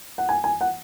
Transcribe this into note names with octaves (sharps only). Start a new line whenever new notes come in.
F#5
G#5
G#5
F#5